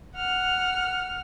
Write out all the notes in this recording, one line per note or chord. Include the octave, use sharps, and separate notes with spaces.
F#5 F6